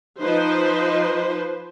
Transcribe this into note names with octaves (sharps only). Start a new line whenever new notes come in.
F3 D#4 B4 C5